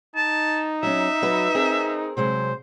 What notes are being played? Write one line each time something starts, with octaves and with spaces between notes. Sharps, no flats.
D#4 A5
F#3 C#4 E5
F#3 F#4 B4
C4 G#4 A#4
C3 F#3 G#3 C5